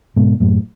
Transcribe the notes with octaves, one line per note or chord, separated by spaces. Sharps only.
G#2 B2
F#2 A2